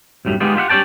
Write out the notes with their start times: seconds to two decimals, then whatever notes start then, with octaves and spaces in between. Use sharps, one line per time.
0.25 B1 F#2 A2 G3
0.40 G#3 B3 D#4 F4 G4 G#4
0.55 F4 G4 E5 F#5
0.70 C#4 G4 C#5 D5 G5 A5